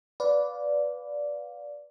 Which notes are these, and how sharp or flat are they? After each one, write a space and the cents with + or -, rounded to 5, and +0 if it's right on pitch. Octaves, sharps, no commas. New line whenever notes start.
B4 +5 D5 -10 F5 +20